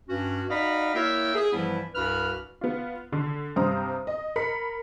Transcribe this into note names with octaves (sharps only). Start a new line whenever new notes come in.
G2 C#4 F#4
D#4 F#4 D5 D#5 F5 B5
A#3 E4 A#4 C#5 E5 G5
G#4
G2 E3 F3 G3 B3 E4
C2 G2 F#4 B4 B5 F6
B3 F4
D3
G2 C3 C4 C5 A#5 D#6
D#5
A#4 B5 B6 C#7